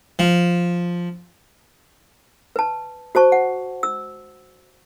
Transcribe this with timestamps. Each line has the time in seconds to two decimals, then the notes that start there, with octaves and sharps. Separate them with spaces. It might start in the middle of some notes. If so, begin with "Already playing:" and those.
0.19 F3
2.56 B4 A5
3.15 F#4 C5 A5 C#6
3.32 F#5
3.83 E6